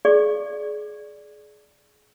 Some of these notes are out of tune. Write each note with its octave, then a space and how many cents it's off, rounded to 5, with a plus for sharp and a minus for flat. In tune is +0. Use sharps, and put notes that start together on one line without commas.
G#4 +25 D5 +0 C#6 -15